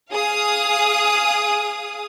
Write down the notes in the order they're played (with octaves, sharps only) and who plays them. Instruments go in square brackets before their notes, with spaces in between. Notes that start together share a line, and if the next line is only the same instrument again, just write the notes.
[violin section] G#4 F5 D#6